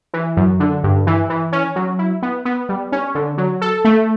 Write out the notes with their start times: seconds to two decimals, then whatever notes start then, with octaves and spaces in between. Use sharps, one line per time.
0.14 E3
0.37 F#2
0.60 D3
0.84 G2
1.07 E3
1.30 E3
1.52 C#4
1.76 F#3
1.99 E4
2.22 B3
2.45 B3
2.69 G3
2.92 C#4
3.15 D3
3.38 F#3
3.62 A4
3.85 A3